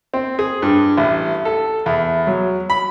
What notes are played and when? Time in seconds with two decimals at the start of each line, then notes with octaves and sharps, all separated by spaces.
0.14 C4
0.39 G#4
0.62 G2
0.98 A1
1.45 A4
1.86 E2
2.27 F#3
2.70 B5